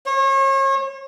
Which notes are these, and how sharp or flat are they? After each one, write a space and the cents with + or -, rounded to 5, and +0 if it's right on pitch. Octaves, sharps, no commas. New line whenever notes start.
C#5 -40